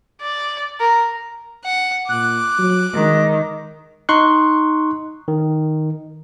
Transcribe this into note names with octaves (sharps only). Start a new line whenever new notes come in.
D5
A#4
F#5
A#2 D6 F#6
F#3
D#3 G#3
D#4 C6 C#6 F#6
D#3